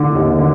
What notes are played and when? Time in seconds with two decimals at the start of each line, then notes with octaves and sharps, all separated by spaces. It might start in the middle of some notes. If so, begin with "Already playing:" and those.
Already playing: D3
0.15 D#2
0.38 D3